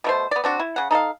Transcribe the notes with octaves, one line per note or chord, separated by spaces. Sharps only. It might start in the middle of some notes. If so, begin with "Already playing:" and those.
B2 A3 C5
B3 D5
C4 D4 F#4
E4
C#3 F#5
D#4 A4 D#5 F5